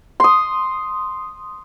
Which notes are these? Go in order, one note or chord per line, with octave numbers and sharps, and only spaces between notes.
C6 D#6